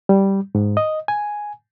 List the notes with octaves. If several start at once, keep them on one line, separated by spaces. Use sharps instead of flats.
G3
G#2
D#5
G#5